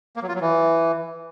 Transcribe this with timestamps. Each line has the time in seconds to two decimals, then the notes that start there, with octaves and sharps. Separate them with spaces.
0.16 A#3
0.22 F#3
0.29 F4
0.35 F#3
0.41 E3